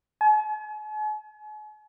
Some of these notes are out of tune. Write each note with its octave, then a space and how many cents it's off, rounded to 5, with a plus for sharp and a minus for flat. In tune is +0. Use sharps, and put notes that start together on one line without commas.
G#5 +45